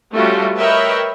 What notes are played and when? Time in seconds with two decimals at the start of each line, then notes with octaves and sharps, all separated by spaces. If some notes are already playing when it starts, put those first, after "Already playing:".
0.12 G3 A3 C#4 F4 F#4
0.57 A#4 B4 C#5 D#5 E5 G5